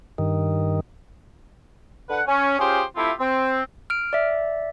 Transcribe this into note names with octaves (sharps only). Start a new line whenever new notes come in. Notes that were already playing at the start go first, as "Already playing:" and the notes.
G2 D#3
D3 B4 F#5
C#4
C#4 F4 G4 G#4 C5
A3 C4 E4 F4 G4
C4
F6 D7
D5 E5